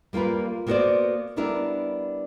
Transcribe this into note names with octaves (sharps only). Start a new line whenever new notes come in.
G3 A#3 F4 A#4 B4
A#3 B3 F#4 G4 C5 D5
G3 B3 D4 E4 A#4